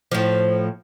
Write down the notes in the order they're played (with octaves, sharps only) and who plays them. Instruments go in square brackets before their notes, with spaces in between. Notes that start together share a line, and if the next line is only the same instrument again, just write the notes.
[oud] A2 F3